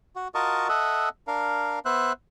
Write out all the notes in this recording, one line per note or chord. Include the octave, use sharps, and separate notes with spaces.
F#4
F4 F#4 A#4 D#5 A5 C#6
A4 D#5 E5 F#5
D4 A#4 F5
B3 C5 E5 F#6